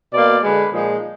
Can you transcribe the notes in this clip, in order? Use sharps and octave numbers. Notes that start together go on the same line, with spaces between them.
B2 A#3 D5
D3 G#3 B4
A#2 F3 G#3 D#4